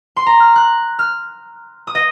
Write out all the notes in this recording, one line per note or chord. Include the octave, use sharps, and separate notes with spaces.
C6
A#5
F6
F#6
F6
D#6
D#5